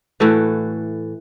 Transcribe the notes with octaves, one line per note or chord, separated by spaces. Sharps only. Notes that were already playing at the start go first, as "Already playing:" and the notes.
A2 E3 A3 F#4